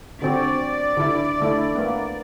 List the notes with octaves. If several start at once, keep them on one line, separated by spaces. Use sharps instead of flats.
D3 C4 F#4 D5
D3 E4
D3 A3 E4
A#3 B3